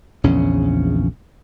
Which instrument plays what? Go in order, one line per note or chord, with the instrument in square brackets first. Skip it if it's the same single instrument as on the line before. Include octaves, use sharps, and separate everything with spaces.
[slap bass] A#1 E2 C#3 C#4